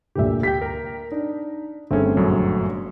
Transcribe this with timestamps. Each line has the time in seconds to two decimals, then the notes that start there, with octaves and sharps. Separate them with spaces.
0.15 D2 A#2 D3 G4 E5
0.43 G4 G5 B6
0.62 A#4 A#5
1.12 D4 D#4
1.91 G1 A3 C4 C#4 G#4 E5
2.17 A#1 F#2 F#3